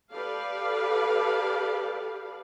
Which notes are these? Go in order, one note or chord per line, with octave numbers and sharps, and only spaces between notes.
G4 A4 B4 D5 F5